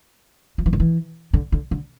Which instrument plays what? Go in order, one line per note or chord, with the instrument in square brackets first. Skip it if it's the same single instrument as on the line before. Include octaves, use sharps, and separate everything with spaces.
[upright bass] F3
E3
D#3
E3
D3
D3
D3